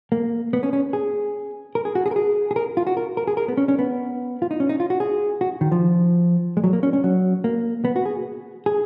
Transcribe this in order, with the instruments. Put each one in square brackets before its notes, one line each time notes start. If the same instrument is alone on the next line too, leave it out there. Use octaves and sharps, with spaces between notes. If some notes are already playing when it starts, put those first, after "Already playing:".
[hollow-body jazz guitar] A#3
B3
C#4
C#4
G#4
A#4
G#4
F#4
G#4
A#4
G#4
G#4
A#4
F4
F#4
A#4
A#4
G#4
A#4
B3
C#4
C#4
B3
F4
D#4
C#4
D#4
F4
F#4
G#4
F#4
D#3
F3
G#3
F#3
A#3
C#4
C#4
F#3
A#3
B3
F#4
G#4
G#4